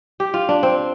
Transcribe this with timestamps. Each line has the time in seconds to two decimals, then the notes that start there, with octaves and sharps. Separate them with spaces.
0.20 G4
0.34 F4
0.49 D4
0.63 C4